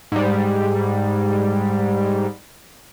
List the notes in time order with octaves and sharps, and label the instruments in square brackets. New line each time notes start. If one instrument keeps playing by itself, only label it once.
[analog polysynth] G#2 G3